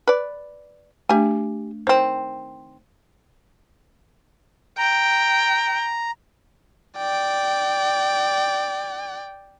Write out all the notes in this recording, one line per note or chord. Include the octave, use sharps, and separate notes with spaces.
B4 D5
A3 D4 G4 G#5
D#3 C4 C5
G5 A#5
D5 G5